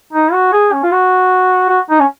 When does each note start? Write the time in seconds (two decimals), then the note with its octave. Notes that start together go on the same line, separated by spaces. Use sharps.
0.13 D#4
0.33 F#4
0.53 G#4
0.72 C#4
0.83 F4
0.92 F#4
1.69 F#4
1.90 D#4
2.00 C#4